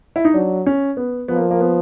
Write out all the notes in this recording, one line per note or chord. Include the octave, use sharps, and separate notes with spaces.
E4
D#4
F#3 D4
C#4
B3
F3 B3
A#3
A#3
B3